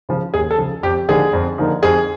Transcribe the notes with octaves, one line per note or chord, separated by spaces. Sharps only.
C#3 F3
D#2 G#4
A4
C#3 F3
F2 G4
D3 F3 A#3 D#4 G#4
F2
D3 F3 A#3 D#4
F2 G#4